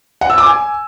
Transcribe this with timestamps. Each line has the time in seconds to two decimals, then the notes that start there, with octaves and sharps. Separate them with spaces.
0.21 F#5
0.30 E6
0.38 D6
0.46 G#5